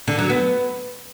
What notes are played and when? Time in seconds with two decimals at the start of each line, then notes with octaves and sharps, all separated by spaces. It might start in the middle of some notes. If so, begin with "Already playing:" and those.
0.08 D3
0.19 F#3
0.30 B3